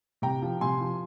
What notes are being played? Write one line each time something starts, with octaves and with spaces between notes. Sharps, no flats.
C3 G5 A#5
F3
C3 G#5 C6
F3